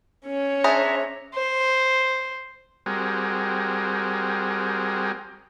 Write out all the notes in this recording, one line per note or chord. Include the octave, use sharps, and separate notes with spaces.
C#4 C#5
D4 G#4 C5 E5 A#5
C5
G3 C4 F#4 G#4 A#4